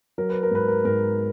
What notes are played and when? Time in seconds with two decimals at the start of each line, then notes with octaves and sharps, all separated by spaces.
0.18 F#3 A#4
0.30 B4
0.43 A#4
0.51 G#2 B4
0.68 A#4
0.84 G#2 A#4